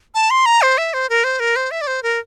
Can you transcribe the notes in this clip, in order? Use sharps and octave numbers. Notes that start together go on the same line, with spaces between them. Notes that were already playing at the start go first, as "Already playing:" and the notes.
A5
C6
A#5
C5
E5
C5
A#4
C5
A#4
C5
E5
D5
C5
A#4